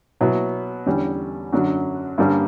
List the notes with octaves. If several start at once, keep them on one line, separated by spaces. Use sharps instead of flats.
B2 F#3 B3 E4
E2 D3 G3 C#4
F#2 D3 F#3
G2 D3 G3 A#3 C#4